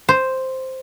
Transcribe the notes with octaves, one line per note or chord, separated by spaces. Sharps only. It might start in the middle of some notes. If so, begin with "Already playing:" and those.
C5